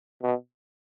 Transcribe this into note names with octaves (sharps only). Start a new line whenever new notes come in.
B2